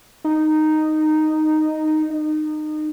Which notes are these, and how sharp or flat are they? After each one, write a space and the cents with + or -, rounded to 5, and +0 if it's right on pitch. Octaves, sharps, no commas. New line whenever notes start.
D#4 -5
D#4 -25